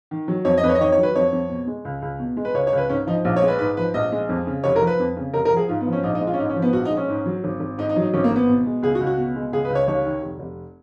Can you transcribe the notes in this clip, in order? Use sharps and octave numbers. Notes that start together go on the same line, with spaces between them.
D#3
F#3
F2 C#5
D#5
F2 B4
C#5
D#5
D#3 C#5
C#5
F#3
B4
F2 C#5
F2
B2
G#3
C#2
C#2
B2
G#3
B4
C#2 C#5
C#5
C#2 B4
G#2 C#4
F3 D#4
A#1 F4
C#5
G#3
B4
G#2 B4
F3 B4
A#1 D#5
G#3
F2
C#3
F1 C#5
A#4
F3
B4
F2
C#3
F1 A#4
A#4
F3 G#4
G#2 F4
B3
F3
C#4
A#1 D#4
D#4
G#3
F4
C#4
G#2 D#4
C#4
F3
B3
A#1 F#4
D#4
G#3
C#4
G#2
F#3
G#1
G#1
G#2 D#4
D#4
F#3
D#4
G#1 C#4
A#3
G#1 B3
B2
G#3
C#2 G#4
F#4
C#2
F#4
B2
G#3
C#2 G#4
B4
C#2
C#5
D#2 C#5
D#3
F1
F1